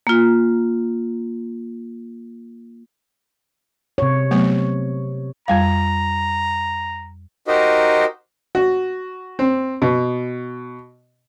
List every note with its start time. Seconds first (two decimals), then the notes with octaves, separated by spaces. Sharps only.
0.07 A#3 F4
3.98 C3 C#5
4.31 F#3 A3 B3
5.48 F2 G3 F5 A#5
7.48 D#4 F#4 G4 A#4 C5 D#5
8.55 F#4
9.39 C4
9.82 B2